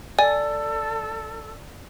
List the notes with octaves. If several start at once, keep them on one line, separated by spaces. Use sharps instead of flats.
A4 D5 G#5